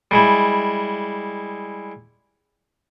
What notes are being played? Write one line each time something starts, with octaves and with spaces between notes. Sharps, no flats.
G3 G#3 E4